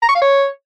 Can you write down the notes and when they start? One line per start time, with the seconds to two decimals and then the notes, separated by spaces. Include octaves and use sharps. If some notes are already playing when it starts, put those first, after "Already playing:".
0.02 A#5
0.09 C#6
0.15 F5
0.22 C#5